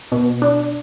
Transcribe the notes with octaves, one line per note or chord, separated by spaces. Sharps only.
B2
D4